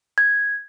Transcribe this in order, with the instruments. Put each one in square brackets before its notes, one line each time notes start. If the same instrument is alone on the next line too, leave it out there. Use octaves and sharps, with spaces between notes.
[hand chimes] G#6